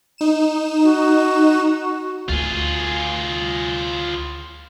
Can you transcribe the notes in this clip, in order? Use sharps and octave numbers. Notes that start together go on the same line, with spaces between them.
D#4 E7
F#4
D2 F4 G#4